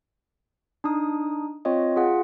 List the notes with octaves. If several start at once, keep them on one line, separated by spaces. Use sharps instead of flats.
D4 D#4 D#6
C4 F4 C#5 D#5
F4 G#4 F#5